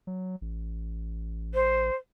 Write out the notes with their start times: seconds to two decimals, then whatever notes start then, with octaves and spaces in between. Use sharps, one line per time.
0.07 F#3
0.41 A1
1.54 C5